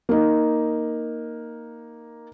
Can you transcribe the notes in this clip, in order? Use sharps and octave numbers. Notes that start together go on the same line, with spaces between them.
A#3 D#4